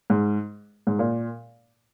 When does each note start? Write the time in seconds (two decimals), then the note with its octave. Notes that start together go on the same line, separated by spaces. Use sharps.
0.10 G#2
0.87 G#2
0.99 A#2